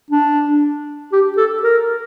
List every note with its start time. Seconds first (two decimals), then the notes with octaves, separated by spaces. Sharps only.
0.11 D4
1.12 G4
1.37 A4
1.63 A#4